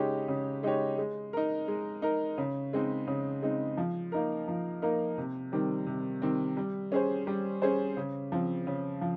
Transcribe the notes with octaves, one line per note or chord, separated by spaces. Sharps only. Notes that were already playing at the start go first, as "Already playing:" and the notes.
Already playing: C#3 G#3 D#4 G4 C#5
C#3
G#3 D#4 G4 C#5
G#3
D#4 A#4
G#3
D#4 A#4
C#3
G#3 C4 D#4
C#3
G#3 C4 D#4
F3
A#3 D#4 A#4
F3
A#3 D#4 A#4
C3
D#3 G3 C4
C3
D#3 G3 C4
G3
C#4 G#4 C5
G3
C#4 G#4 C5
C#3
F3 C4
C#3
F3